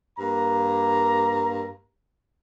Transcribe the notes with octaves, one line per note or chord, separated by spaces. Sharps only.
G2 A#3 A#5